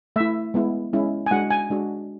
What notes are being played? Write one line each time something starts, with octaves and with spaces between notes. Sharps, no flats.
A3 E4 E5
G#3 B3 E4
G#3 C#4 E4
G#5
G#3 D4 F#4 F#5
G#5
G#3 D4 F#4